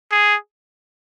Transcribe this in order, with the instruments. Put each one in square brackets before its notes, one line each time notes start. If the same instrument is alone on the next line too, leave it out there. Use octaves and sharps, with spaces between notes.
[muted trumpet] G#4